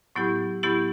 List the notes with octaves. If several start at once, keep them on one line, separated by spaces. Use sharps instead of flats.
A2 F#3 B3 E4 G4
A2 F#3 B3 E4 G4